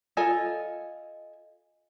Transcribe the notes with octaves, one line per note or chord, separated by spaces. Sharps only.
F4 A4 D#5 G#5